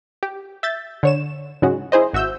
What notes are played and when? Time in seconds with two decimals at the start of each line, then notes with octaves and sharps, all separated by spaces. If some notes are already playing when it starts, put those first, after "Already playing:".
0.23 G4
0.63 E5 G6 A6
1.03 D3 C#5 E7
1.62 G#2 C#3 F#3 G#3 C#4 F#4
1.92 E4 G#4 C5 D#5
2.13 G#1 F#4 E5 E6 G6